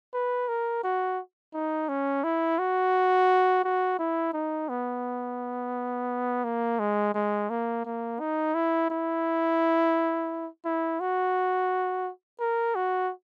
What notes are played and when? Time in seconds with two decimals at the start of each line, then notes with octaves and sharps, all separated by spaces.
0.14 B4
0.48 A#4
0.83 F#4
1.53 D#4
1.89 C#4
2.24 E4
2.59 F#4
3.64 F#4
3.99 E4
4.33 D#4
4.69 B3
6.44 A#3
6.79 G#3
7.14 G#3
7.50 A#3
7.85 A#3
8.20 D#4
8.54 E4
8.90 E4
10.65 E4
11.00 F#4
12.40 A#4
12.75 F#4